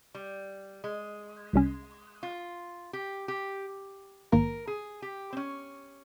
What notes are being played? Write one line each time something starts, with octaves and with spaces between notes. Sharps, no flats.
G3
G#3
C2 C3 G3 C#4
F4
G4
G4
A#1 G#2 D#3 A#3 A#4
G#4
G4
C4
C#4